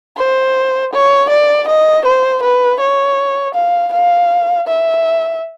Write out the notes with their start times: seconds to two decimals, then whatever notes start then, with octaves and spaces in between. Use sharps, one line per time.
0.17 C5
0.93 C#5
1.30 D5
1.68 D#5
2.05 C5
2.43 B4
2.80 C#5
3.55 F5
3.93 F5
4.68 E5